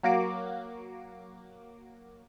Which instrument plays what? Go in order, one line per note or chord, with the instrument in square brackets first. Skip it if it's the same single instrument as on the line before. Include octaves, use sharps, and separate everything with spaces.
[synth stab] F#3 A#3 F#4 D6